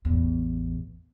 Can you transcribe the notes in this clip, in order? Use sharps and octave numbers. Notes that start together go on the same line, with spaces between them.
A1 E2